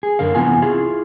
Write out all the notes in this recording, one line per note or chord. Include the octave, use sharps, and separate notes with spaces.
G#4
F#2 D3 A#4 F5
C3 E3 B3 F4 G#5
E4 F4 G#4